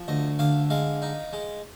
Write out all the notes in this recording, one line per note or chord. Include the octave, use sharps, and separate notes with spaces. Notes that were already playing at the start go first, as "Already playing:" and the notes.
Already playing: F3
D2 D#5
D3 F5
G#3 F5
D#4
G#3